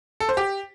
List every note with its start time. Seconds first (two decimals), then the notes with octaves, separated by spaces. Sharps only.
0.20 A4
0.29 C5
0.37 G4